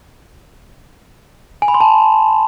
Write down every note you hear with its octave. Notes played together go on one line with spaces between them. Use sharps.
G#5
B5
C6
A5